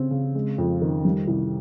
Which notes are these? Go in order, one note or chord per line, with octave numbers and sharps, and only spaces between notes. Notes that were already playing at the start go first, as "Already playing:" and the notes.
Already playing: C#3 C4
C#3
G#3
F2
D#3
G3
C2